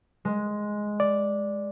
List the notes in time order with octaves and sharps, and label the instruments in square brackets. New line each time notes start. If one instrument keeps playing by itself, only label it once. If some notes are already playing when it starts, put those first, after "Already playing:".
[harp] G#3
[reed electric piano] D5